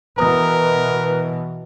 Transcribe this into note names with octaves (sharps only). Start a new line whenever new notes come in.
B2 E3 A#4 B4 A#5 D#6 A#6